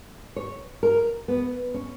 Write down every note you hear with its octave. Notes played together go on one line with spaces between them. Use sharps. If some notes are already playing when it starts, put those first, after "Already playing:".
C#5
A#4
B3
C#4